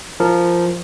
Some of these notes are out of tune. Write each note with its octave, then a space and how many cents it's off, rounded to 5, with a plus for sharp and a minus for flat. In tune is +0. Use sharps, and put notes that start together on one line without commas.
F3 -10 A#4 -10